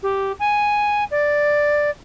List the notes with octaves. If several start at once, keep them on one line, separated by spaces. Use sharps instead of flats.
G4
G#5
D5